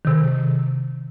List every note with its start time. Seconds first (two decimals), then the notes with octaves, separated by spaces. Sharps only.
0.05 C3 D#3